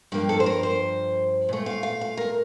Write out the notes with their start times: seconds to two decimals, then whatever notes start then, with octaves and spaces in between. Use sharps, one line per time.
0.12 G2 F3 A#3 G4
0.29 A4
0.40 C5
0.46 A#4
0.63 C5
1.49 A#2 A3
1.66 F5
1.83 F5
2.01 F5
2.17 A#4